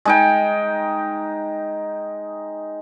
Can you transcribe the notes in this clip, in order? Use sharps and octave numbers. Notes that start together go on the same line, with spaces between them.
G#3 D#4 G5